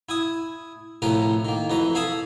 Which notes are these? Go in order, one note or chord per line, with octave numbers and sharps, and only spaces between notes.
E4 G#5 D#6
A2 C3 F3 A#4 B4 A#5
D#3 A#3
F2 E3 B4 A#5
A4 F5 G#5 A5 B5 D#6